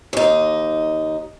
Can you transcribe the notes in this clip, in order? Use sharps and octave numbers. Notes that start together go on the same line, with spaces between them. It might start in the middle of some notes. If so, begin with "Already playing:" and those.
D#2 D#4